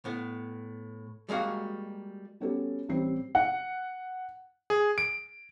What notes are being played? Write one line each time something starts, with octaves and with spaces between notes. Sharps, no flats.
A2 B3
G3 G#3 A#3 F#4 F5
G3 B3 C#4 F#4 G4 A4
A1 G3 C4 C7
F#5
G#4
D7